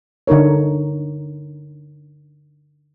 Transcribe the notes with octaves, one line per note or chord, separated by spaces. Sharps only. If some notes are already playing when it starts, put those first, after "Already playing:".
D3 D#4 A#4 C#5